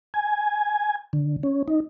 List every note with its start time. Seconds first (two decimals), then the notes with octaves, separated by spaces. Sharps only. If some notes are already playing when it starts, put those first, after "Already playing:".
0.14 G#5
1.13 D3
1.43 C#4
1.68 D#4